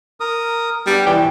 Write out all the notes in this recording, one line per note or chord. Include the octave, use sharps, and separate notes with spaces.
A#4 D#6
G3 B3 D4
E3 C#5 D5 G5